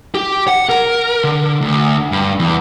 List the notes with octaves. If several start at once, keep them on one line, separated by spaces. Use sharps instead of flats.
G4
F#5
A#4
D3
D2
G2
E2